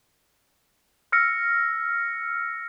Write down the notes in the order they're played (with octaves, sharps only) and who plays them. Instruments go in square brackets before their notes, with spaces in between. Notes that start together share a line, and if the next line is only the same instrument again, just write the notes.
[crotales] E6 F6 A#6 C#7